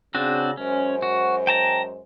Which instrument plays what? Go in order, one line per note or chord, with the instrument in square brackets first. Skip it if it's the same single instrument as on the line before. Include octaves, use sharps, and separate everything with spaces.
[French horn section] C#3 [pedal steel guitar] C4 D4 F#4
[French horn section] F#2 G#3 C5 [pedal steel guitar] C#4
[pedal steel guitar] F#4
G5 A5 A#5